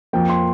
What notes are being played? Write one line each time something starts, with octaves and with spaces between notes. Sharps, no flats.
F2 F3 A#3 G5
C6